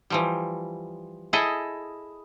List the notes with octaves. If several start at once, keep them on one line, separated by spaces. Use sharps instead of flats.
E3 F3 G3
E4 G#4 A4 D#5 E5